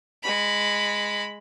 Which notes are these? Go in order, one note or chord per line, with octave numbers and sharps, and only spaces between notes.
G#3 B5